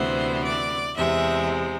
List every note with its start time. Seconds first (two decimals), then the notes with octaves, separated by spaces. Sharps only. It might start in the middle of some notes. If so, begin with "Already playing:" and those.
Already playing: D2 C3 E3 B3 C5
0.43 D5
0.96 E2 C3 G#3 E5